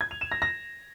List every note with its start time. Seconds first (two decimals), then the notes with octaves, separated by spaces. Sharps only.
0.01 G#6
0.11 F7
0.21 E7
0.32 A#6
0.42 A#6